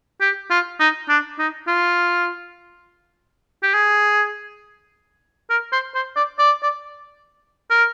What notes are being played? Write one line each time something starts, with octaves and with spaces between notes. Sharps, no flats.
G4
F4
D#4
D4
D#4
F4
G4
G#4
A#4
C5
C5
D5
D5
D5
A#4